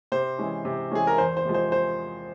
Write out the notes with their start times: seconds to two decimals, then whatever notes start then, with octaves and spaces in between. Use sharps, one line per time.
0.12 C3 C5
0.38 E3 G#3 C#4
0.65 C3
0.91 E3 G#3 C#4 G#4
1.07 A#4
1.18 E2 C5
1.37 C5
1.45 C3 F3 G#3
1.54 C5
1.72 C5